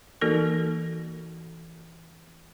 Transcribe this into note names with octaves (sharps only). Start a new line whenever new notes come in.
E3 A#3 D#4 F#4 A4 A#4